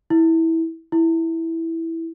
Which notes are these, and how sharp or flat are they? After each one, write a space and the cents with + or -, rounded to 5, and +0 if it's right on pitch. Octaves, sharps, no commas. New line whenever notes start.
E4 -15
E4 -5